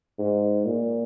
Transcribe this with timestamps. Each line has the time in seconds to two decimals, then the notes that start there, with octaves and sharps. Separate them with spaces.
0.18 G#2
0.65 A#2